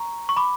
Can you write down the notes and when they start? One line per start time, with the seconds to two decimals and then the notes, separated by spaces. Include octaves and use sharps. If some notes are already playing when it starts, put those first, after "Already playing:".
Already playing: A#5 C#6
0.29 C#6
0.36 B5 D6